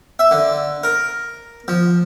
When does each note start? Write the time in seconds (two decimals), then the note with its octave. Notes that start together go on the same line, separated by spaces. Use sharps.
0.19 E5
0.31 D3
0.84 A#4
1.68 F3